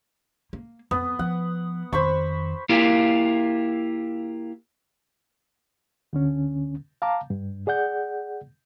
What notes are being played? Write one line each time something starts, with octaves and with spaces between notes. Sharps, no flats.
A#3
F2 B3
F3 F#5
F2 D#3 C5 B5 C#6
A#3 E4 F4 G4 A#4
D2 D3 C#4
F5 A5 A#5 D6
G2
G#4 D5 F#5 G6